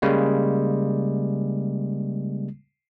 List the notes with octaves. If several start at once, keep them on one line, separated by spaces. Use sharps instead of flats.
C#3 G3 G#3 A#3